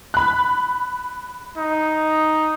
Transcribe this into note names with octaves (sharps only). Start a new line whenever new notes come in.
B5 F#6
D#4